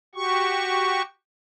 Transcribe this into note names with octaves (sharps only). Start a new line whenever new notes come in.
F#4 G4 C#6